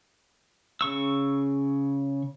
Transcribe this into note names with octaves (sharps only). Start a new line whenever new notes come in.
C#3 C#6 E6